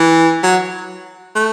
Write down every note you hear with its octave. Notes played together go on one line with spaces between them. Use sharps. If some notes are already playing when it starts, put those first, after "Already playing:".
Already playing: E3
F#3
A3